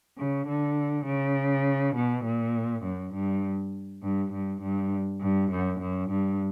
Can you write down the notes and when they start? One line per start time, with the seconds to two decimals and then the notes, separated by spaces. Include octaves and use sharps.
0.18 C#3
0.47 D3
1.05 C#3
1.96 B2
2.25 A#2
2.83 F#2
3.14 G2
4.03 G2
4.33 G2
4.61 G2
5.21 G2
5.51 F#2
5.80 F#2
6.10 G2